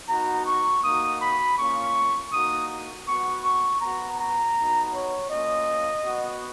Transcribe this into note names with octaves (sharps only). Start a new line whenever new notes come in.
B3 D#4 F#4 A#5
C#6
A#3 D#4 F#4 D#6
B5
A#3 C#4 F4 C#6
A#3 D#4 F#4 D#6
B3 F#4 C#6
C#6
B3 F#4 A#5
A#5
B3 D#4 F#4
C#5
A#3 C#4 F4 D#5
B3 F#4